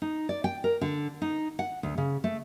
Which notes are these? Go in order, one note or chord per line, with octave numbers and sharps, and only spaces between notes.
D#4
D5
G5
A#4
D3
D#4
F#5
D2
C#3
A3